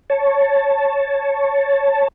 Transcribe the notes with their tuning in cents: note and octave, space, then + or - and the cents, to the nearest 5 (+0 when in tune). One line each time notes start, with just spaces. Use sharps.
C#5 +0 A5 +0